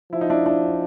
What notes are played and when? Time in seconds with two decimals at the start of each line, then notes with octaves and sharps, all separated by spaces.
0.12 F3 E4
0.21 D#4
0.30 D4 E4
0.46 D4 E4